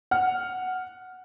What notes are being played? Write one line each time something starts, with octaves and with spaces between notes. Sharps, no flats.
F#5 F6